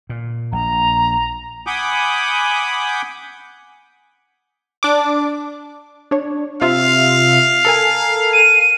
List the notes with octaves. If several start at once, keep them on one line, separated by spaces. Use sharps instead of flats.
A#2
A#1 A#5
F#5 G#5 B5 D6 D#6 G6
D4 D6
D4 C#5
C3 F4 E5 F5
A4 A#4 G#5
D#7